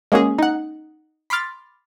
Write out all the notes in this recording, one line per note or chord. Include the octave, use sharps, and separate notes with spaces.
G#3 A#3 C#4 F#4 G#4
D#4 F#5
B5 C6 D6 F6 A6